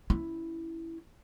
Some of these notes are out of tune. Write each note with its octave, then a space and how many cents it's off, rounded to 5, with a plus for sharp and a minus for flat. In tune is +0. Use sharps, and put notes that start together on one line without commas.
C#4 +10 E4 +0